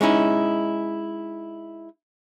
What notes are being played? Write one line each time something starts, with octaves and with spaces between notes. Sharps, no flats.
G#3 C#4 D#4 E4